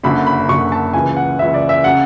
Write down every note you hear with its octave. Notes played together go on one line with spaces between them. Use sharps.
F#1 F#2 D3 F#3 B5
B5
F#1 F#2 D3 F#3 C#6
A5
C#2 C#3 E3 G#5
F#5
C#2 C#3 E3 E5
D5
E5
C#3 F#3 F#5